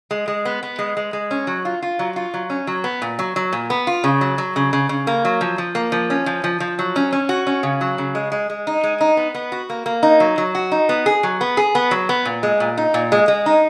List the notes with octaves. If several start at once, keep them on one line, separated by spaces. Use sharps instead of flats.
G#3
G#3
B3
B3
G#3
G#3
G#3
C#4
F#3
F4
F4
F#3
F4
F#3
C#4
F#3
B3
A#2
F#3
F#3
A#2
B3
F4
C#3
F#3
F#3
C#3
C#3
C#3
A#3
F#3
F3
F3
A#3
F3
C#4
F3
F3
F3
F#3
C#4
C#4
F#4
C#4
C#3
F#3
C#3
G#3
G#3
G#3
D#4
G#3
D#4
B3
B3
F#4
A#3
A#3
D#4
F#3
F#3
F#4
D#4
B3
G#4
F#3
B3
G#4
B3
F#3
B3
A#2
G#3
A#2
D#4
A#2
G#3
G#3
D#4